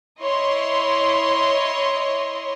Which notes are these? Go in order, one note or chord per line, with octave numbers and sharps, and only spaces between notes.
E4 C#5 D#5 C6